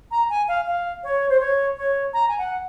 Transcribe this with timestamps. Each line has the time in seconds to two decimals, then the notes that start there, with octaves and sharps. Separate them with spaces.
0.11 A#5
0.30 G#5
0.48 F5
0.66 F5
1.03 C#5
1.29 C5
1.40 C#5
1.77 C#5
2.13 A#5
2.28 G#5
2.38 F#5